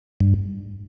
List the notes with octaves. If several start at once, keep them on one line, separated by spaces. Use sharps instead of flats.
G2